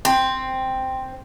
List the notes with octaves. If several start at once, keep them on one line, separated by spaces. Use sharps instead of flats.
C4